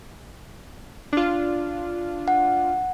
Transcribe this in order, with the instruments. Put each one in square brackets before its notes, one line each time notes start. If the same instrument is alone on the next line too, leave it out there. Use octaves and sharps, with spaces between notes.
[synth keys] D4 F4
[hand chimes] F#5